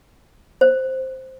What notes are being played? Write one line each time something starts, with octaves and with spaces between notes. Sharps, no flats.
C5